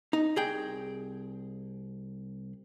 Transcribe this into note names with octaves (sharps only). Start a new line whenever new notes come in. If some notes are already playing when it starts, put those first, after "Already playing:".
D#4
C2 G#4 G5